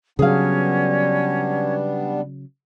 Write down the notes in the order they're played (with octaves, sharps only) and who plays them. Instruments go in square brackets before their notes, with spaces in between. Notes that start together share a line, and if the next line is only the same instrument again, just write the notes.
[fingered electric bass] C#3 F#3 [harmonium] G3 B3 D4 [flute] C#4 [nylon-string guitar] G#4 F5